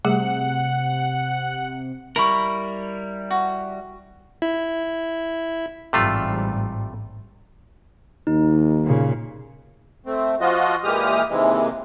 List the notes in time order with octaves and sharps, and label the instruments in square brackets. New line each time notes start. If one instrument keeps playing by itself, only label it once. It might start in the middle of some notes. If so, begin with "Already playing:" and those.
[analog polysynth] C3 [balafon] G3 A3 G#4 [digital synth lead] F#5
[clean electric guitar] G3 E4 A#4 [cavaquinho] B5 C#6
[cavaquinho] F#4
[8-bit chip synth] E4
[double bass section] A1 G#2 G3 [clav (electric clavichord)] C3 A3 F4
[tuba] D#2 [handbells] D#4
[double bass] A#2 C#3
[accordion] A3 C4
F3 F4 F#4 D#5
A#2 E3 G#3 G4 D#6 F6
D#2 C3 E3 G#3